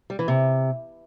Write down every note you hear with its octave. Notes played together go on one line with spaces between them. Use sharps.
G3
E3
C3